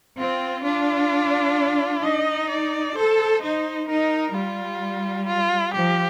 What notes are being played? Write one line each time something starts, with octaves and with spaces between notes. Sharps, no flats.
C4 F4
D4 F4
D#4 D#5
D5
A4 C5
D#4 C5
D#4 A#4
G3 F4
F4
F3 G4